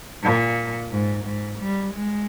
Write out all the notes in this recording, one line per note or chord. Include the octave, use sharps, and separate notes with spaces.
A#2
G#2
G#2
G3
G#3